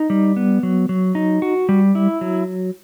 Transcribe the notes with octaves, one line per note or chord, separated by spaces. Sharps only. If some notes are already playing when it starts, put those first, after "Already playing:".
Already playing: D#4
G3
B3
F#3
F#3
D#4
F#4
G3
E4
F#3